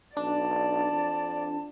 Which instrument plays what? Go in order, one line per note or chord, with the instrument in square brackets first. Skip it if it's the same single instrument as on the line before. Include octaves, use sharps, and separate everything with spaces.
[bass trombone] B1 [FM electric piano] D4 [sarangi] D5 [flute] A5
[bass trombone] F2